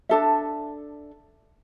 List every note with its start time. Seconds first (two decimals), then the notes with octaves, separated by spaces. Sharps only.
0.09 D4 A4 E5